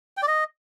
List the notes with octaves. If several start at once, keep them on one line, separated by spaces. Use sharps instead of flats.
G5
D5
D#5